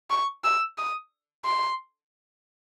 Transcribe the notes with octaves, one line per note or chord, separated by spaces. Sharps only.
C#6
E6
D#6
C6